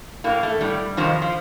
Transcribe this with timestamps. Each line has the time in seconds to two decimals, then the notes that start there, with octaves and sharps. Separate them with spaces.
0.24 A2 A#3
0.43 A3
0.61 A2 G3
0.97 F2 C3 D#3 F3
1.22 F3